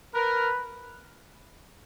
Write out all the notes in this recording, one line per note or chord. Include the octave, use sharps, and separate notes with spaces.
A#4 B4